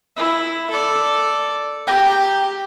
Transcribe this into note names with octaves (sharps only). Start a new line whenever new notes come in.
E4
A4 D5
G4 G5 A#5